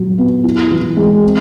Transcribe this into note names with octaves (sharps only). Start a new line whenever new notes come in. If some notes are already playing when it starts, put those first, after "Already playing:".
Already playing: F#3 F#4
B3
E4
E3
G#3
C4